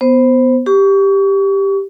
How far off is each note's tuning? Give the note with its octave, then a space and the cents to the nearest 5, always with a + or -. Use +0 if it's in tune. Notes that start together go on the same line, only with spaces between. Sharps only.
B3 +10 C5 +0
G4 +5 C#6 +35